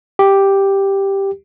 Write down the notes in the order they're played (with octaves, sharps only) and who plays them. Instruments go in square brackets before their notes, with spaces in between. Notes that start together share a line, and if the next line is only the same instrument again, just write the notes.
[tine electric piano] G4